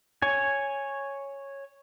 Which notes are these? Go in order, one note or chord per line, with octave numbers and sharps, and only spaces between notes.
C#5 G#5